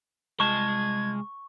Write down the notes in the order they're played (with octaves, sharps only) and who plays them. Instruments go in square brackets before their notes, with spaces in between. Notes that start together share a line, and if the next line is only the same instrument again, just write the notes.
[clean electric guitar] C2 F4 A5 [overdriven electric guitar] G#3 D#5 [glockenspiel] C#6 [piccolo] G#6